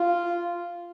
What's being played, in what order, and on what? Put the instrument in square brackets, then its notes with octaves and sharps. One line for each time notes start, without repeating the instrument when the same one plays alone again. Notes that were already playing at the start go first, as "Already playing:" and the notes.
Already playing: [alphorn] F4